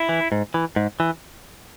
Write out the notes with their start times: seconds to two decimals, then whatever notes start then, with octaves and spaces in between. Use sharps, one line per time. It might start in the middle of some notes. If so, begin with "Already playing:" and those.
Already playing: E4
0.09 E3
0.32 G#2
0.54 E3
0.76 G#2
1.00 E3